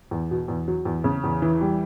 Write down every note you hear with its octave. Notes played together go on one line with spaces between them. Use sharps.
E2
B2
E2
F#3
E2
C#3
E2
E3
G3